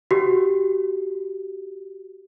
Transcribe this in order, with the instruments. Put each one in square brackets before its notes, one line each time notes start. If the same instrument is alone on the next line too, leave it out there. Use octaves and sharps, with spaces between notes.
[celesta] F#4 G4